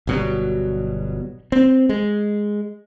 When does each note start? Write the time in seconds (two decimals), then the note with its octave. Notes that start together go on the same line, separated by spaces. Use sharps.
0.07 G1 B2 F#3 G3
1.52 C4
1.89 G#3